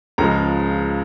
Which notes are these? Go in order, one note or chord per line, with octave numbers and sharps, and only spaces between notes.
C#2 C#3 F3 G#3 A#5